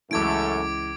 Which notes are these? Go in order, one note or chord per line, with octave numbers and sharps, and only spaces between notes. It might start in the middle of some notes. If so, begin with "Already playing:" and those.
C#2 F#2 E3 A3 D6 G#6 D7